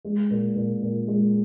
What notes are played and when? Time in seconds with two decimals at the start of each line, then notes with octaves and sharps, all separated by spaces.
0.05 G#3
0.31 A#2
0.56 A#2
0.83 A#2
1.08 G#3